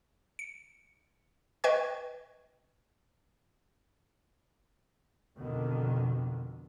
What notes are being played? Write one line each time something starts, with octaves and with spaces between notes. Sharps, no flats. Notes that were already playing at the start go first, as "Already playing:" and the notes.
C#7
B4 D#5 G5 C#6 G#6
F2 B2 D3 D#3